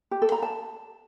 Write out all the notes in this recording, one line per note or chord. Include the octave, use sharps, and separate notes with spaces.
G4
A4
A#5
A5